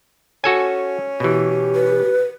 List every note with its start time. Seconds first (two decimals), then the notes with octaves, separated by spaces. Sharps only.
0.44 C#4 F#4 A4 G#5
1.20 B2 E3 G4
1.75 B4